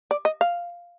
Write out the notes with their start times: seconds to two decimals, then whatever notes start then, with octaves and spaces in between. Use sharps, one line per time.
0.11 D5
0.25 D#5
0.41 F5